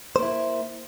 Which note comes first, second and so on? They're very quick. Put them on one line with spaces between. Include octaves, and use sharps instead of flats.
C5 A#3 E4